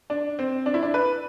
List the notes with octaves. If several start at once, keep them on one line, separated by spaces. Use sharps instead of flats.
D4
C4
D4
E4
D4
B4